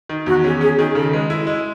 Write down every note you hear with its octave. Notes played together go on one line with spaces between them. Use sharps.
D#3
E2 F#4
C#4 G#4
C#4 G#4
D#3 G#4
C#3 A4
G#3 B4
E4 D#5
G#3